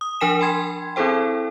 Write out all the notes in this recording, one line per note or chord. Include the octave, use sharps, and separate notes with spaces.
D#6
F3 D4 A#4 G#5 B6 E7
G5 B5 C6 G#6
C4 E4 G#4 A4 C5 G5